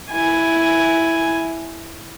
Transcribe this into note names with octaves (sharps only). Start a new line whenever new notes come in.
E4 G#5